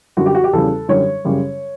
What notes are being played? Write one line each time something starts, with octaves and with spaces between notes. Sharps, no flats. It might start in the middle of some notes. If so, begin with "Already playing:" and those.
F#2 D3 G3 F#4
G4
F#4
G4
E2 C#3 G3 A4
F#2 D3 G3 C#5
F#2 C#3 G3